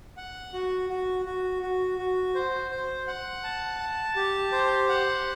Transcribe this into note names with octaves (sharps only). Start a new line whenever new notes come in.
F#5
F#4
F#4
F#4
F#4
F#4
C5
C5
F#5
A5
A5
G4
C5
F#5